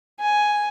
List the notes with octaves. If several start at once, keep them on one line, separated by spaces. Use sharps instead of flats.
G#5